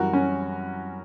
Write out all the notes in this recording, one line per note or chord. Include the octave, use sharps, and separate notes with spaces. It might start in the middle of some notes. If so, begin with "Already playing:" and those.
Already playing: F#2 E3 G3 F#4 A#4
C#4